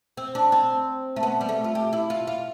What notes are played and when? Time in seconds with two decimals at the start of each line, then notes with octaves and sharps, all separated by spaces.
0.17 C4
0.35 D4
0.52 C4
1.16 A3
1.23 B3
1.41 G3
1.49 A3
1.64 F4
1.75 G4
1.93 E4
2.10 F4
2.27 F4